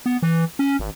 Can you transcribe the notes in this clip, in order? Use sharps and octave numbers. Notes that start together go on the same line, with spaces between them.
B3
E3
C#4
G#1